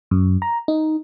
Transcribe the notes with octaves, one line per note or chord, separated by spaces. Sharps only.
F#2
A#5
D#4